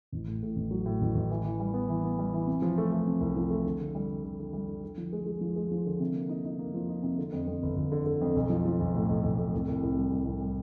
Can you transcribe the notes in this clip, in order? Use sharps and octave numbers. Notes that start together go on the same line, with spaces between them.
A1
A2
A2
A1
F#3
A2
A1
A1
E3
E3
G3
B3
E3
B3
G3
E3
C3
F3
A3
A3
C3
C2
F3
A3
D3
D3
G3
D3
D3
D3
G3
D3
D3
F3
G#3
G#3
F3
G#3
F3
D3
C3
A#3
D#4
D#4
A#3
F3
D#4
C3
D3
F2
F2
G1
G1
D3
D3
F2
B1
F3
F3
B1
A2
B1
B1
A2
C2
C2
C2
G3
G3
C2
G3